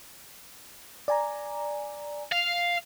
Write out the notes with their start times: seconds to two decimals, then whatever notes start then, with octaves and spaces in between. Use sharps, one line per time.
1.08 D5 G#5 A#5
2.32 F5